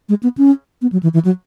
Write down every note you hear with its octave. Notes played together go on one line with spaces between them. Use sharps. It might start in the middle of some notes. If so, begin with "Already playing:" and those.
G#3
B3
C#4
B3
F#3
E3
E3
F#3